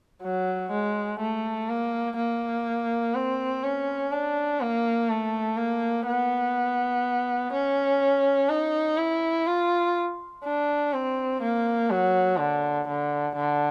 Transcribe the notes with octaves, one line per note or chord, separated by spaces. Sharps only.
F#3
G#3
A3
A#3
A#3
C4
C#4
D4
A#3
A3
A#3
B3
C#4
D#4
E4
F4
D4
C4
A#3
F#3
D3
D3
D3